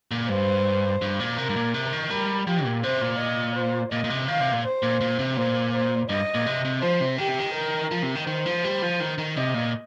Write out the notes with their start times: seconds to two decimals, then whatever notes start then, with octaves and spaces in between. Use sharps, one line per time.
0.11 A#2
0.29 G2 C5
1.02 G2
1.20 A#2
1.37 C3 A#4
1.49 G2
1.56 A#2
1.74 C3
1.93 D#3
2.10 G3 A#4
2.47 F3 G4
2.65 A#2
2.83 C3 C5
3.01 A#2
3.20 D#5
3.56 C5
3.92 A#2 D#5
4.04 A#2
4.10 C3
4.28 D#3 F5
4.40 C3
4.52 A#2
4.65 C5
4.83 A#2
5.01 A#2
5.19 C3
5.37 A#2 C5
5.74 C5
6.09 G2 D#5
6.34 A#2
6.46 C3
6.65 C3
6.82 F3 C5
7.01 C3
7.18 D#3 G4
7.28 C3
7.39 D#3
7.54 A#4
7.91 F3
8.03 C3
8.15 D#3
8.27 D#3 C5
8.46 F3
8.64 G3
8.82 F3
9.00 D#3
9.18 D#3
9.36 C3 D#5
9.54 A#2